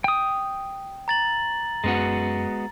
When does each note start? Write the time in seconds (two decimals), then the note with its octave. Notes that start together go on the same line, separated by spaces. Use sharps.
0.04 G5 D#6
1.08 A#5 A6 F#7
1.84 F#2 G#3 B3 C#4 F#4